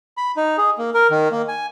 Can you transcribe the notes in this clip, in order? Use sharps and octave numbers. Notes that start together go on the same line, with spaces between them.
B5
D#4
G#4
A#3
A#4
D#3
A#3
G#5